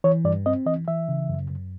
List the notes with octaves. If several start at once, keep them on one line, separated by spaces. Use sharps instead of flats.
E3 C#5
G2 D5
C4 D#5
E3 D#5
E3 E5
C#3
F#2
F#2